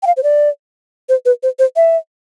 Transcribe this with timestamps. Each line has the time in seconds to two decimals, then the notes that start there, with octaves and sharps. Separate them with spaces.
0.03 G5
0.07 F5
0.17 C5
0.23 D5
1.09 C5
1.26 B4
1.43 C5
1.59 C5
1.76 E5